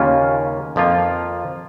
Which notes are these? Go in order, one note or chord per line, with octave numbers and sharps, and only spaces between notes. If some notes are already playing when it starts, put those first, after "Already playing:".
Already playing: D#2 C#3 A#3 C#4 F4
F2 F3 A#3 F4